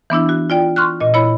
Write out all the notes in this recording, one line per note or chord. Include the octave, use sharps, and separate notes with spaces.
E3 B3 D4 E4
F#4
F4 D5 G5
C6 C#6 F6 F#6
A#2 D#5
E4 C#5 B5